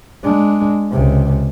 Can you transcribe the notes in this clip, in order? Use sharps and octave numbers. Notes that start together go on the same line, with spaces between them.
G#3 D4
C#2 C3